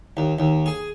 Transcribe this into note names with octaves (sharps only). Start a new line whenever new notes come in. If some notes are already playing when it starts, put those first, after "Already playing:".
D#2
D#2
G#4